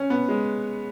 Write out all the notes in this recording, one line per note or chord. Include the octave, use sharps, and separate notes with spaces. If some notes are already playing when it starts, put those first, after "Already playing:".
Already playing: C#4
B3
G#3